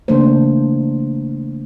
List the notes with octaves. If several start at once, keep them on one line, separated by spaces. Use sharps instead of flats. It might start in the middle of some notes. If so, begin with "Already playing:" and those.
C#3 E3 A3 A#3 D4 C5